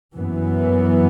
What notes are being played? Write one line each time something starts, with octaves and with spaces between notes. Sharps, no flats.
F#2 E3 B3